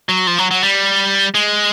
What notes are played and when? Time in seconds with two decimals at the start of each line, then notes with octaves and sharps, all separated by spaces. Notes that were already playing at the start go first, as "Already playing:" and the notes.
0.09 F#3
0.27 F3
0.38 F#3
0.51 F#3
0.63 G3
1.34 G#3